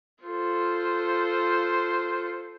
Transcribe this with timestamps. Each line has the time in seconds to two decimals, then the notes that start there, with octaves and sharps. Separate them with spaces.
0.24 F4 A4 C5